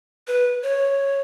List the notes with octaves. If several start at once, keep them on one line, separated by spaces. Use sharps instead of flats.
B4
C#5